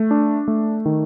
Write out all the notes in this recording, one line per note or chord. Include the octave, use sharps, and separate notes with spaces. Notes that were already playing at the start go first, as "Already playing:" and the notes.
Already playing: A3
D4
A3
D#3